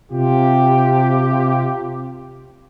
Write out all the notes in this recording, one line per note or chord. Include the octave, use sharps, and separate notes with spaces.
C3 F4 G4